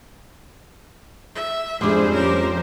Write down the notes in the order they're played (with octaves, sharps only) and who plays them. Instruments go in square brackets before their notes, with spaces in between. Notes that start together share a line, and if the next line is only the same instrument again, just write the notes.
[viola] E5
[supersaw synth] F2 C5 [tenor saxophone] G3 [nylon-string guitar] G#3 D4 [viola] G#4
[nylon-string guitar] C#4 [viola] G4 A#4